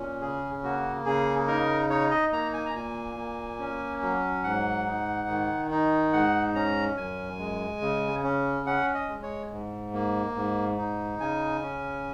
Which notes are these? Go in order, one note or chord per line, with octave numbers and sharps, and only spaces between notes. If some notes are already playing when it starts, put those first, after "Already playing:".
Already playing: A#2 C#4
C#3 G#4
A#3 F#4
C#3 G#4
D#4 A#4
D#4 C#5
D#5
A#3 A#5
G#5
A#5
A#2 G#5
A#3
C#4
F#3
G#2 F#5
D#4
D#3
D#4
G#2 F#5
C#4 A#5
F#2 G#5
G#3
C#3
C#4
C#4 F#5
D#5
G#3
C#5
G#2
A#3
G#2
D#4
C#3 G#5
C#4